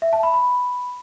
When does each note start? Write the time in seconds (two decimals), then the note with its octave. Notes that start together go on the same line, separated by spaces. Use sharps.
0.02 E5
0.13 A5
0.23 B5
0.34 B5